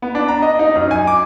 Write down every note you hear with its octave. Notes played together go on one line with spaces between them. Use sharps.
B3
D4
A#5
D#5
D#4
F#2
G#5
D6